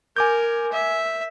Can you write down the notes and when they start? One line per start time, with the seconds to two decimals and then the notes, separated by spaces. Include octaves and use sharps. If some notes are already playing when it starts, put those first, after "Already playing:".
0.16 A#4 G#5 D6 G6
0.72 E5